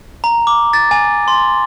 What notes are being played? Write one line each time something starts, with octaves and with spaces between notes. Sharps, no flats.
A#5
D6
A6
G#5
C6